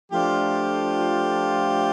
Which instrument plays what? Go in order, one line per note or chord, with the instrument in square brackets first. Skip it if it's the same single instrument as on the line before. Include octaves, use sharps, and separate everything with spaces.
[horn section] F3 A3 D4 F4 [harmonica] G4